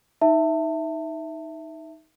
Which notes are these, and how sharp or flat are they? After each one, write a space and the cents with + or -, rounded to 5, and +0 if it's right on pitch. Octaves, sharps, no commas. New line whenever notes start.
D#4 +10 E5 +0 A5 +30